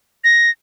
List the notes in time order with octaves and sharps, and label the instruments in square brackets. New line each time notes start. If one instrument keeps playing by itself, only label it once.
[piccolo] A#6